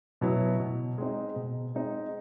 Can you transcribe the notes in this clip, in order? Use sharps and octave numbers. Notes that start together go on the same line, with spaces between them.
B2 F#3 B3 E4
B2
G#3 C4 D#4
B2
G#3 C4 D#4